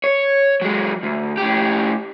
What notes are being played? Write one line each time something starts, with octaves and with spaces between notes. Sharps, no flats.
C#5
F#3 G#3
D2
A2 G4